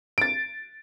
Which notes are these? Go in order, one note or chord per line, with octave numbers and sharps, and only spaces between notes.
A6 D7